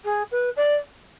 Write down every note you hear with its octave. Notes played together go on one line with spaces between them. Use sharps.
G#4
B4
D5